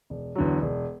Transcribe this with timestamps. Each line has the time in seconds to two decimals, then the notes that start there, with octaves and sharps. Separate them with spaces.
0.10 E1
0.36 E2 D3 F#3
0.62 E1